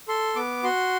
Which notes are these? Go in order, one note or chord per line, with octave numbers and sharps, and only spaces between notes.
A4 C6
B3 D6
F#4 C6